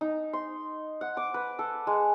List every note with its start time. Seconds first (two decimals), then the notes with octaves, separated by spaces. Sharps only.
0.01 D#4
0.33 C6
1.01 F#5
1.17 D6
1.34 B4
1.59 A4
1.87 G#3